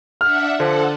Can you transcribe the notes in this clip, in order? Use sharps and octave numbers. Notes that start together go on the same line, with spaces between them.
D4 E5 F#5 F6
D3 F3 A4 F#5